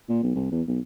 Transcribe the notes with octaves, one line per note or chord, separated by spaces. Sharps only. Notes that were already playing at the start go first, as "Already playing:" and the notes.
A#2
B1
C2
E2
B1